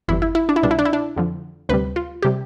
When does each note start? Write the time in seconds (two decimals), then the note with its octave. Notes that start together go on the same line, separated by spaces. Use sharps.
0.08 G1 F2 E3 G3 E4
0.22 E4
0.35 E4
0.49 D4
0.56 E4
0.63 C2 B2 G3 D4
0.71 E4
0.79 D4
0.85 E4
0.93 D4
1.16 F2 D3 F3
1.69 D2 C3 G3 B4
1.96 F4
2.22 C3 G3 G4